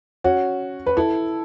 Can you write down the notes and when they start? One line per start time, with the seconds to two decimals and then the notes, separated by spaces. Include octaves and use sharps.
0.24 C#4 F#4
0.86 B4
0.97 E4 A4